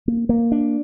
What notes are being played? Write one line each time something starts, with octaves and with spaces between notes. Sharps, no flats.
A#3
A#3
D4